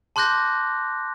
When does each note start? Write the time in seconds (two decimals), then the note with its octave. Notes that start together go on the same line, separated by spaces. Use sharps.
0.16 A5 C6 D6 F#6 G6 A#6